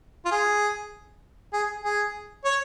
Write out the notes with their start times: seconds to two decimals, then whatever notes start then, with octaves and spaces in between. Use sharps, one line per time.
0.25 F4
0.31 G#4
1.53 G#4
1.84 G#4
2.44 C#5